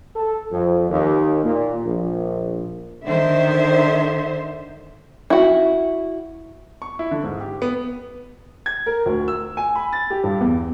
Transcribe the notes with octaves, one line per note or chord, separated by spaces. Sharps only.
A4
F2
D#2
A#2
A#1
D3 D#3 C5 E5
E4 F#4
C#6
E4
D3
G#2
G4
B3
G#6
A#4
D2
E6
G#5
B5
A6
G4
G2
E2